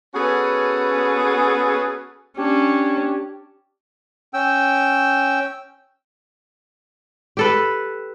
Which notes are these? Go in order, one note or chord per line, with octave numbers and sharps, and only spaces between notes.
B3 C#4 F#4 G#4 A4 B4
C#4 D4 G4
C#4 G5 E6
G4 A4 B4